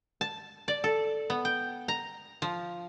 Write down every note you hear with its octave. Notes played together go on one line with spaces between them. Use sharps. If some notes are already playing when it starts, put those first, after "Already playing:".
A5
D5
A4
B3
G5
A#5
F3